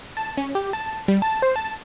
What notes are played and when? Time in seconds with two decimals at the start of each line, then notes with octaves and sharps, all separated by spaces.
0.17 A5
0.37 C#4
0.55 G4
0.73 A5
1.08 G3
1.22 A5
1.42 C5
1.56 A5